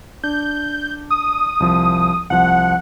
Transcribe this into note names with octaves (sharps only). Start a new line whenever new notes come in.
D4 G6
D#6
C2 F3
C2 F3 F#5